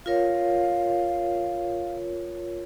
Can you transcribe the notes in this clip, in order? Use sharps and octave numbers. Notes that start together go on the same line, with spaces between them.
F4 A#4 C#5 F5